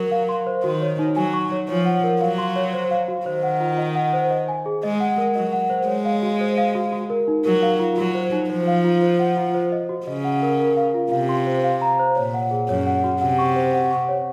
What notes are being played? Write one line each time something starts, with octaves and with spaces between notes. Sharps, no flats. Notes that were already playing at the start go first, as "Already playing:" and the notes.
Already playing: F#3 A#4
F5
C6
C5
D#3 F#4
C#5
D#4
F#3 G#5
C#6
C#5
F3 C#5
F#5
A#4
F#3 F5
C6
C#5
C5
F5
F#4
D#3 C5
F#5
F4
D#5
F#5
C5
D#5
G#5
G#4
G#3 D#5
F#5
A#4
F#3 D#5
F#5
C5
G#3 C#5
F5
F#4
C5
F5
F#4
F#4
A#4
D#4
F#3 A#4
F5
F4
F#3 F#4
C5
D#4
F3 C5
F5
F4
C5
F#5
F4
C5
D#5
F#4
C#3 D#5
F#5
A#4
A#4
F5
F4
C3 F5
C6
C5
F5
A#5
C5
A#2 C#5
F#5
G#4
F#2 C#5
F#5
F#4
C3 F#5
C#6
C5
F#5
C#6
C#5